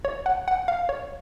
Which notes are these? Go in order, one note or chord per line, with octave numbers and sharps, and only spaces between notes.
C#5
F#5
F#5
F5
C#5